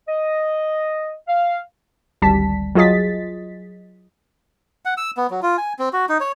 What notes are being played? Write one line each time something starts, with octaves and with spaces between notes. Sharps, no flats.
D#5
F5
G#1 D2 G3 A5 B6
F#3 F4 G#4 D#5 A6 B6
F#5
E6
B3
F#3
F4
G#5
C4
F#4
D#4
C#5